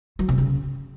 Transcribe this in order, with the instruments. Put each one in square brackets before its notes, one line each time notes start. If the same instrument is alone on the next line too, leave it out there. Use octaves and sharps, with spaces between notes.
[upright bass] F#3
C3
C#3